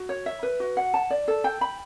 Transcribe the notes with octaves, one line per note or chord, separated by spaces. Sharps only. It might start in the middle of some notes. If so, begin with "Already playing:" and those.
Already playing: F#4
C#5
E5
B4
F#4
F#5
A5
D5
A4
G5
B5